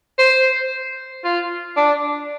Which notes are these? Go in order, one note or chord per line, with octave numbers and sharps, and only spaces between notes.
C5
F4
D4